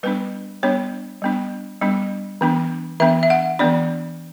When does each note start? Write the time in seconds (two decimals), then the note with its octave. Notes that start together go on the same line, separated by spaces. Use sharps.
0.03 G3 B3 D4 B4
0.63 G3 B3 D4 C#5
1.22 G3 B3 D4
1.82 G3 B3 D4
2.41 E3 B3 D4
3.00 E3 B3 D4 E5
3.23 E5
3.30 F#5
3.59 E3 B3 D4 D5